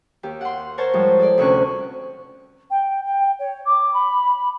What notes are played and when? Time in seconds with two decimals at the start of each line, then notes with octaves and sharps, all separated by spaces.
0.23 D#2 G4
0.41 F#5 C6
0.78 A#4 C5 C#5 A5
0.93 G#2 F3 G3
1.19 A4 D5
1.38 D2 C3 C#4 C#6 F#6
2.70 G5
3.05 G5
3.39 C#5
3.65 D6
3.93 B5